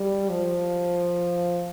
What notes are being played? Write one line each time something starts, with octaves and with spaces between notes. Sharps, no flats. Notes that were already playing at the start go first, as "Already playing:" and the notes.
Already playing: G3
F3